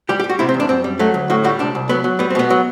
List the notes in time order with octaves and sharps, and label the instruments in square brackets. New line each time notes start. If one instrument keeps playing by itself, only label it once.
[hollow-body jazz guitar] G3 G4
G4
G3
F#4
C3 E4
C4
E2
D4
F#2 C4
G3
F#3 A3
D2
A2 F#4
G3 F#4
C2 D4
C2
F#3 B3
F#3
G3 B3
C4
B2 B3
F#3